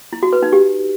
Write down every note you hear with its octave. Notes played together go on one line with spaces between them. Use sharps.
E4
F#4
B4
D#4
G4